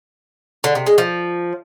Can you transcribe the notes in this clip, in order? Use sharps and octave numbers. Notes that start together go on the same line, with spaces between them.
D3
C3
G#3
F3